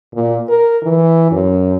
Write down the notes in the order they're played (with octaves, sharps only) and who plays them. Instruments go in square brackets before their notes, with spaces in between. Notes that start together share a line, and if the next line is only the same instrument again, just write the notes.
[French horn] A#2
A#4
E3
F#2